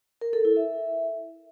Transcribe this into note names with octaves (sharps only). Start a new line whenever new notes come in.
A#4
A4
E4
E5